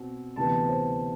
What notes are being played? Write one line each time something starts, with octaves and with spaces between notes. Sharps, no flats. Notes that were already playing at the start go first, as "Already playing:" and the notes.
Already playing: B2 C4
D2 C3 E3 B3 A5
C5